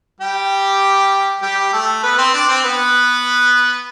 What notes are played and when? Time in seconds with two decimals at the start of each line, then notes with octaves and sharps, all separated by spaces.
0.20 G3 G4
1.42 G3 G4
1.73 A3 A4
2.03 B3 B4
2.18 C4 C5
2.33 D4 D5
2.49 C4 C5
2.64 B3 B4